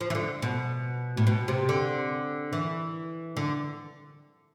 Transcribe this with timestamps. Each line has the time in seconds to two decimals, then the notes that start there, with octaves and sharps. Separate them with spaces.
0.01 F3
0.10 E3
0.15 D3
0.42 B2
1.17 A2
1.27 B2
1.48 C3
1.69 D3
2.53 E3
3.37 D3